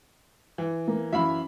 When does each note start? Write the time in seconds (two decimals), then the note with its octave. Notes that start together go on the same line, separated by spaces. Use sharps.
0.58 E3
0.88 A#3
1.13 F#2 E3 E5 F5 B5